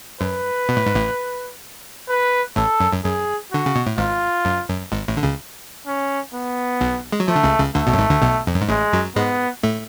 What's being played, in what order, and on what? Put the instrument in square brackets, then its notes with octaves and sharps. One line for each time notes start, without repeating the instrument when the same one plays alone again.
[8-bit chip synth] F#2 [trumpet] B4
[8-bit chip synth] B2
A2
G#2
A1 A2
[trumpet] B4
[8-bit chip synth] A1 A2 [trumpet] A4
[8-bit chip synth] F#2
F#2
[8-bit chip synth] F#2 [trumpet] G#4
[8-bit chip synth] D3 [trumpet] F#4
[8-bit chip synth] C#3
B2
A2
[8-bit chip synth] G#1 G#2 [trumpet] F4
[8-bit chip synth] F#2
F#2
G#1 G#2
A1 A2
D3
C#2 C#3
[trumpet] C#4
B3
[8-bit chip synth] B1 B2
G#3
F#3
[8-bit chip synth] F3 [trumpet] A3
[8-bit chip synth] D3
C#2 C#3
C#2 C#3
[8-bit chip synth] D2 D3 [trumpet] A3
[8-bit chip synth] B1 B2
F#2
G#1 G#2
D2 D3
B1 B2
F2
F#2
G#2
[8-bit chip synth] A1 A2 [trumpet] G#3
[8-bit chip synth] F#2 F#3
[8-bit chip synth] G#2 G#3 [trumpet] B3
[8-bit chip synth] A2 A3